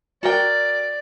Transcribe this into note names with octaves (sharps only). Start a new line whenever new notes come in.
F#4 A#4 D5 G5